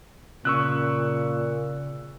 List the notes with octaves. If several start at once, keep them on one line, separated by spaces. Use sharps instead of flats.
A#2 C#3 C#6 E6 F#6